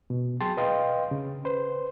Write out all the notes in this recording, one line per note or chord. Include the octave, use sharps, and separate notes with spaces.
B2
F#3 G#4 G5 A5 C6 A6
B4 D#5 F5 G5 C6
C#3
B4 C5